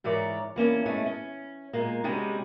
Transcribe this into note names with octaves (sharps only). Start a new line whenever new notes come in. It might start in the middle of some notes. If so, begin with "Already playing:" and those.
G#2 E3 A#4 C#5 D5
E3 A#3 C#4 D4
G#3 A3 C#4
C#4
A#2 G#3 A#3
C3 G3 G#3 C#4 F#4